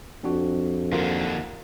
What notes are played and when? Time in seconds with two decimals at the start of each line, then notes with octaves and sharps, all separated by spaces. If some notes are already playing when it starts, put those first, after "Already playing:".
0.24 F2 C4 D4 F#4
0.92 D#2 D3 F4 A#4